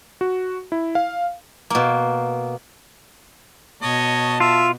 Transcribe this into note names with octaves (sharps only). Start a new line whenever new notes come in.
F#4
E4
F5
B2 A#3
B2 C#5 D#5 A5
F4 E5